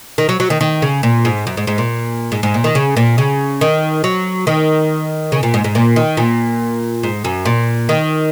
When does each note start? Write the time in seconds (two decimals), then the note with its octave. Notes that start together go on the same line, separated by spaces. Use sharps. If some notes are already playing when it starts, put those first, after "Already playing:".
0.18 D#3
0.29 F#3
0.40 F#3
0.50 D#3
0.61 D#3
0.82 C#3
1.03 A#2
1.25 G#2
1.47 F#2
1.57 G#2
1.67 G#2
1.78 A#2
2.32 G#2
2.43 G#2
2.54 A#2
2.64 D#3
2.75 C#3
2.97 A#2
3.18 C#3
3.61 D#3
4.04 F#3
4.47 D#3
5.32 C#3
5.43 A#2
5.54 G#2
5.64 G#2
5.75 A#2
5.96 D#3
6.17 A#2
7.03 G#2
7.25 F#2
7.45 A#2
7.89 D#3